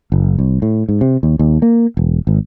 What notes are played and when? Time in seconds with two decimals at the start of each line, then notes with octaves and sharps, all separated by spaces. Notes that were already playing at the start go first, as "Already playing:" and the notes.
0.12 F#1
0.38 C2
0.62 A2
0.89 G#2
1.01 C3
1.23 D#2
1.39 D#2
1.62 A#3
1.97 E1
2.27 G#1